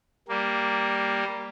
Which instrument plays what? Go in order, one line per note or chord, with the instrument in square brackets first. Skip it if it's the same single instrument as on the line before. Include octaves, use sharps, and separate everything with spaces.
[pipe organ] G3 A#3